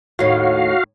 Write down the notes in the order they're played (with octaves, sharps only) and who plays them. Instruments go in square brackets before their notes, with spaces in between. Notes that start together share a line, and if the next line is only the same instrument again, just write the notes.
[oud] D#2 A2 [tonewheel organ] F#4 F5